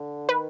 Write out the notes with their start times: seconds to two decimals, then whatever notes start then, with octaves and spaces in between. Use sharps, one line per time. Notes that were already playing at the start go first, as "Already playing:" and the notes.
Already playing: D3
0.28 D#3 B4